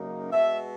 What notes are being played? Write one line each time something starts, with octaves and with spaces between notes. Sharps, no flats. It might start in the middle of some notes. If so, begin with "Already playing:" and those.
Already playing: F#2 C#3 F#3 A#3 D#4
B2 G#3 B3 E5